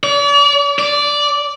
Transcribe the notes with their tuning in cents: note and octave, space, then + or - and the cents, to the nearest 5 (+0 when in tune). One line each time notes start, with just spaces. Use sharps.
D5 -45
D5 -10